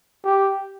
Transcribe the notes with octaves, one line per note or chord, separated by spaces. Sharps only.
G4